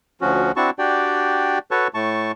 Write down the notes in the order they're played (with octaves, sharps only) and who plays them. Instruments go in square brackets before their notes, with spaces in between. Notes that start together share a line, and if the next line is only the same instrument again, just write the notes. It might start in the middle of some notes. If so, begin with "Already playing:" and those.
[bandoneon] D2 F3 C#4 F#4
C4 D4 E4 F#4 A5 C#6
D4 F#4 G4 D5 G5
F#4 A4 B4 C#5 A5 C#6
A2 A3 A5 C#6